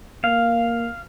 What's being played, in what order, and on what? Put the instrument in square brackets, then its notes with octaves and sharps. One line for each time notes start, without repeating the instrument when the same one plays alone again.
[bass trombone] A#3 [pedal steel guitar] F5